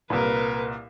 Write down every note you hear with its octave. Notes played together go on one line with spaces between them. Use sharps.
C2 A#2 A#4 B4